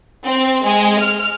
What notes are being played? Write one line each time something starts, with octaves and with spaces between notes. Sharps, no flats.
C4
G#3
F6